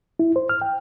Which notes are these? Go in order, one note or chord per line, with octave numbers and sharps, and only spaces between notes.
E4
C5
F6
G5